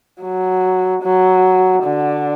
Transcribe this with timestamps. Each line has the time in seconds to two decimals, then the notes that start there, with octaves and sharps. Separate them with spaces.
0.21 F#3
1.03 F#3
1.84 D3